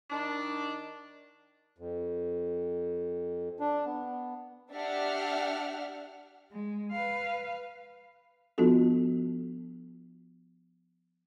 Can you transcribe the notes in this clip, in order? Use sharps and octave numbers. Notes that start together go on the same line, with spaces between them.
D#3 D4
F2
D4
B3
D4 G4 E5 F#5 F6
G#3
B4 F5
F3 B3 D4 F4 F#4 A4